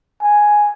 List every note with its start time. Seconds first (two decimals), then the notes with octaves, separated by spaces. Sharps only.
0.23 G#5